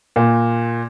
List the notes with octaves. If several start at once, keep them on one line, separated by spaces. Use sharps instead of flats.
A#2